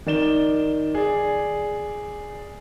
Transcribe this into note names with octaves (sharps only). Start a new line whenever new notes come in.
D#3 D5 E7 G7
G#4 D5